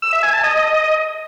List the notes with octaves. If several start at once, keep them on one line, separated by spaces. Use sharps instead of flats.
E6
E5
G#5
A5
D#5